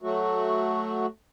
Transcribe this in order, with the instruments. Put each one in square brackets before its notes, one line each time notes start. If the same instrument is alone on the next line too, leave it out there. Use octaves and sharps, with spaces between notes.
[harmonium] F#3 A3 F#4